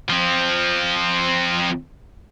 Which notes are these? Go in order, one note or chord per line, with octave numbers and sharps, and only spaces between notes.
F3 C4